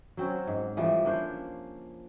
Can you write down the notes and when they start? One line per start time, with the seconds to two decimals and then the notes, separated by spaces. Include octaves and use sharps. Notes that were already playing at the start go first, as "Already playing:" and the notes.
0.17 F#3 C4 C#4
0.47 G#2
0.77 E3 F3 G3 A3
1.05 A#3 C#4 D4 C5